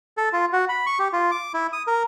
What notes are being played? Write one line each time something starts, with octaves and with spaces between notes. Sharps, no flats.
A4
F4
F#4
B5
C#6
G4
F4
D6
E4
D#6
A#4